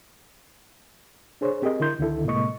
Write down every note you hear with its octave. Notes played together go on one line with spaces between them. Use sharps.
D4 G#4 C5 C#5
C4 G4 G#4 A#4 D#5
D3 E4 A#4 C6 G6
C#2 D3 D#3 E4 A4
A2 C3 G#3 A#3 D#5 C#6